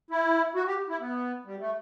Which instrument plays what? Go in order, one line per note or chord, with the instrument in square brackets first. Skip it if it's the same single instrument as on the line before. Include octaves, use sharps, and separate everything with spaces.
[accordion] E4
F#4
G4
E4
B3
G3
A3